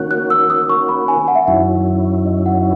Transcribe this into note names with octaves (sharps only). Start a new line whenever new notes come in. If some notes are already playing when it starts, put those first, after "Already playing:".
Already playing: D#3 A#3 C#4 F#4 F#6
F#6
E6
D#6
C#6
B5
G#5
F#5
E5
F#5
F#2 D#3 F#3 C#4 E4
D#5
F#5